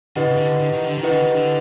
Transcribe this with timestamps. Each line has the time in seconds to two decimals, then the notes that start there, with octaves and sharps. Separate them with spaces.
0.16 D3 E4 G4 B4 D#5 F#5
0.27 C#3
0.37 D3
0.60 D3
0.73 D#3
0.84 D3
0.97 D#3
1.03 E4 G4 B4 D#5 F#5
1.10 D3
1.22 D#3
1.35 D3